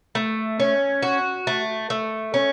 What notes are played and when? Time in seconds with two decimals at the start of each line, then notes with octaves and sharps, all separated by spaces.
0.15 A3
0.60 C#4
1.02 F#4
1.47 A3
1.90 A3
2.34 C#4